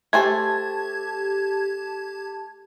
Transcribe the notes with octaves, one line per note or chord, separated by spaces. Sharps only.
A3 G4 C5 G#5 A5 G#6